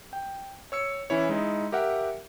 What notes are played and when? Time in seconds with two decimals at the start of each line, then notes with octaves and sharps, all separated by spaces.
0.13 G5
0.72 C#5 E6 C#7
1.10 E3 C#4 E4 C#5
1.29 G#3 D#4 E4 D#5
1.72 G4 A#4 E5 F#5